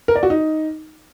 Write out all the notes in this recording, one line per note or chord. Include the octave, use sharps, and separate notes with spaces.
A#4
D5
F#4
D#4